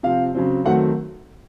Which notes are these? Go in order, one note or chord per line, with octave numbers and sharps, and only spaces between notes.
C3 F3 C4 F5
C#3 F#3 C4
D#3 F#3 A3 C4 F#5